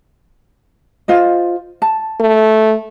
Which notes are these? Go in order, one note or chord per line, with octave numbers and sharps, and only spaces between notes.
F4 C5 D#5
A5
A3